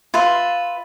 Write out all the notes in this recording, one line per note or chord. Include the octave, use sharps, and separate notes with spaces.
F4 B4 E5 C6